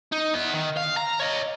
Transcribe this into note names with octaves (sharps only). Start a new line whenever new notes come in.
D#4
B3 E4
D#3
F5
A#5
C#5 D#5